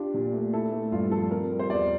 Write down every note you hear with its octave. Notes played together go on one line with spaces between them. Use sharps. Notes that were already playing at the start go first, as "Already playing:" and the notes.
Already playing: D4 F4 G4
A#2
A3
E4 A4
A3
G2 F4
F3 A4
C4 A#4
G3
C5
E2 D5